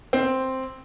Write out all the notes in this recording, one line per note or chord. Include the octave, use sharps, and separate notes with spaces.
C4